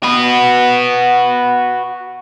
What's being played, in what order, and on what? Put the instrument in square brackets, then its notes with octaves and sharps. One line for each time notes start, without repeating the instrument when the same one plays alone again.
[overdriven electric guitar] F#4 B4